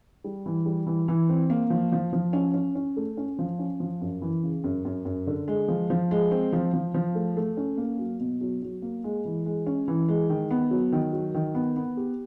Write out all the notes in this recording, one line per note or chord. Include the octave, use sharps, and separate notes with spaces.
G3
E3
G3
E3
E3
C4
A#3
F3
F3
F3
C#4
C#4
C#4
A3
C#4
F3
C#4
F3
F#2
E3
C#3
F#2
F#2
F#2
D3
G#3
F3
F3
G#3
C4
F3
F3
F3
A3
A3
C#4
A#3
F#3
B2
F#3
F#3
A#3
G#3
E3
G#3
C#4
E3
G#3
D#3
B3
F#3
D#3
F#3
D#3
B3
B3
G4